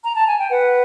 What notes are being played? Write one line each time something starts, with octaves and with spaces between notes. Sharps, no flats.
A#5
A5
G#5
G5
B4 F#5